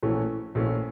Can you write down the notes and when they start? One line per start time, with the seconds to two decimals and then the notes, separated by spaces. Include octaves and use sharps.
0.03 A#1 A2 E3 A3 C#4
0.55 A#1 A2 E3 A3 C#4